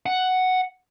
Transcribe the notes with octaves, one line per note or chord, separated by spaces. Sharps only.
F#5